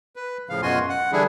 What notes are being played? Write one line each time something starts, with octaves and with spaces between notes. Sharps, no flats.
B4
A2 C#3 F3 F5
F#2 B2 F4 F#4 G#5 C6
F#5
D3 E3 G3 D4 E4 G#4